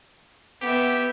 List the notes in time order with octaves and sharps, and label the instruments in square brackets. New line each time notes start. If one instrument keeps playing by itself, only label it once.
[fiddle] B3 E5 [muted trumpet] G4